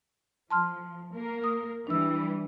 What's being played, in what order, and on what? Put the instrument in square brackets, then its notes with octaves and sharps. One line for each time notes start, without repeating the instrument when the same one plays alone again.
[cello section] F3 [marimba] A5 C6 F6
[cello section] A#3 A#4
[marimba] D#6
[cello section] E3 G3 [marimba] D4 E6